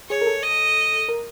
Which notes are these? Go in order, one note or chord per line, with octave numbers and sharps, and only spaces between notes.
G#4 C#5
A#4
A4
D#5
A#4